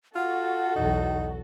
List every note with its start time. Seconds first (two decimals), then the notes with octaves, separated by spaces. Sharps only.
0.16 F4 F#4 A4 F#5
0.76 B1 E2 D#4